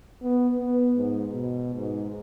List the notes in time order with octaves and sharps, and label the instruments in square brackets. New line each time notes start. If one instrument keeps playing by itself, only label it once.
[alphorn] B3
B3
G#2
B2
G#2